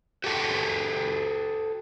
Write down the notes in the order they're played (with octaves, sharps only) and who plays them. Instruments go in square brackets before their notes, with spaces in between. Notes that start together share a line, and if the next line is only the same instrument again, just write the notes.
[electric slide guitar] F#4 G4 A4 F#5 G5